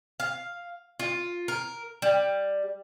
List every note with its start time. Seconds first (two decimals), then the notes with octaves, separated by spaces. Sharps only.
0.20 F5
1.00 F4
1.48 A#4
2.02 G3